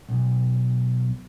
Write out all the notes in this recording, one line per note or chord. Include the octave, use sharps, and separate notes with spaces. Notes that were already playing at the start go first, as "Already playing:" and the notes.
B1